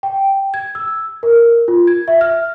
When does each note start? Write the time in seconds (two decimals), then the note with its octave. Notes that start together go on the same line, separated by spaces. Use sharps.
0.03 G5
0.54 G#6
0.75 E6
1.23 A#4
1.68 F4
1.87 G#6
2.08 E5
2.21 F6